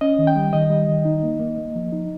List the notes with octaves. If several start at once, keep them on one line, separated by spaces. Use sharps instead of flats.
C#4 D#5
D#3
G5
G3
D#3 D#5
G3
D#3
D#4
A#3
A#3
A#3
F3
D#4